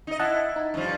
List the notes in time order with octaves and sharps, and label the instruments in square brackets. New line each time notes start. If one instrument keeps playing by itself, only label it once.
[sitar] D#4 D#5
[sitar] E4 [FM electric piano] D#5 F#5 A5
[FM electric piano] D#4
[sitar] G2 F3